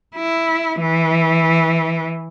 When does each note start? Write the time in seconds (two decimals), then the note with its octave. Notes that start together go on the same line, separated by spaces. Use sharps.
0.16 E4
0.81 E3